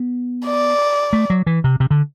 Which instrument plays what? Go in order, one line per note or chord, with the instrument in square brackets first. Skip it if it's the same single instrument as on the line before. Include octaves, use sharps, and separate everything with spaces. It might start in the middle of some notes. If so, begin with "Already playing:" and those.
Already playing: [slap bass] B3
[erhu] D5
[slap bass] A3
F#3
E3
C3
C3
D3